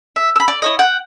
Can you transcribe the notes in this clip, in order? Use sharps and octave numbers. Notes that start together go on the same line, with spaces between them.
E5
B5 E6
D5
E4 C#5 D#5
F#5 G5